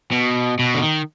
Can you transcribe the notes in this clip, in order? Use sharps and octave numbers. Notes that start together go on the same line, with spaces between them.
B2
B2
D3
D#3